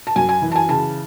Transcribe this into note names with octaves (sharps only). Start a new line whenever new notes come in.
A5
F#2 G#5
G#5
E3
A5
G#5
C#3 A5